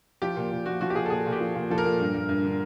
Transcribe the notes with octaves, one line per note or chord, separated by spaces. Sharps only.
F3 G4
A#2
A#2
F3 F#4
F3 F#4
G4
A#2 G#4
A4
A#2 G#4
A#2
G4
F3
A#2
F3 A4
A#4
A#2
G2
G2
G2
D3